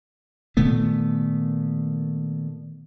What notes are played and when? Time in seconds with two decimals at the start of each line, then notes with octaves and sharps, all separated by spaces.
0.57 A#2 D#3 A3 B3